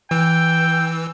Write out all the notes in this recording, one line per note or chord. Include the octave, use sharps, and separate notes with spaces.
E3 G5 E6